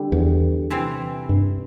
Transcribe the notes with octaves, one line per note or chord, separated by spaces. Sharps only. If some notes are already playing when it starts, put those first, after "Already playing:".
Already playing: D3 G3
E2
C3 E3 C4
G2